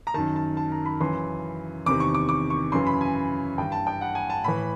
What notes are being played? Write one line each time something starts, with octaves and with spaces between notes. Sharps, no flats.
A#5
F#2 D#3 A5
A5
A5
A#5
B5
F#2 C#3 E3 C6
E2 C3 D#3 D6
C#6
D6
D6
C#6
F#2 C#3 E3 C6
B5
G#5
G2 E3 G5
A5
G5
F#5
G#5
A5
A2 E3 B5